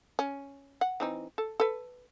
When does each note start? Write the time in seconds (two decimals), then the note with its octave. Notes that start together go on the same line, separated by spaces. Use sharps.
0.19 C#4
0.81 F#5
1.00 E3 C4 D#4
1.38 A4
1.60 A4 B4